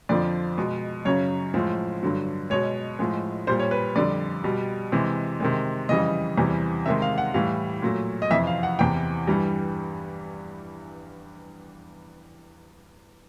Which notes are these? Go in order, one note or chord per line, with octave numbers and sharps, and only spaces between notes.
F2 D3 F3 D5
B2 G#3
F#2 C#3 F#3 C#5
A2 F3 G#3
G2 D3 F#3
B2 G#3 C#5
A2 F3 G#3
A#2 G3 C5
C#5
B4
F2 D3 G3 D5
B2 G3
C3 E3 G#3
C3 D#3 G#3
F2 C#3 E3 G3 D#5
E2 C3 E3 G3
C3 D#3 G#3 E5
F5
F#5
A2 E3 G3 F5
A#2 F#3 A3
D#5
F2 C3 E3 E5
F5
F#5
E2 C3 E3 G5
G2 E3 G3